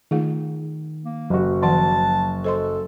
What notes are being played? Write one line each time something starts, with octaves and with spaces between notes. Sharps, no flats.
D#3 A3 F4 G#4
A#3
F#1 F#3 F#4
D#3 F3 F#5 A5
A4 C5 D#5 C6